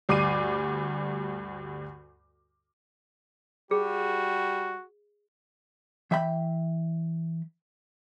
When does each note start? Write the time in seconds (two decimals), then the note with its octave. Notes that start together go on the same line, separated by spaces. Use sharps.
0.09 D2 G2 D6 C7 D#7
3.71 G3 F#4 G#4
6.11 E3 E5 G5 B5